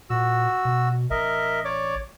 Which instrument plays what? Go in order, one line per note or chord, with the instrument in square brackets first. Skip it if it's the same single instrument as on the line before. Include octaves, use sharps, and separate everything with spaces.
[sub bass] A#2 [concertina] F#4 E6
[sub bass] B2
[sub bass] A1 [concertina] A#4 D#5 E5
[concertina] C#5 D5 D6